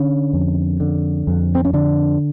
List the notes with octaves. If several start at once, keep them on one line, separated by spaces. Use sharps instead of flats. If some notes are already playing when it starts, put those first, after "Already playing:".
Already playing: D3 C#4
F2
D3
F2
C4
C#4
D3 D4